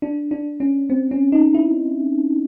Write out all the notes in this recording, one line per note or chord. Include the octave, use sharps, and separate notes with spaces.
D4
D4
C#4
C4
C#4
D#4
E4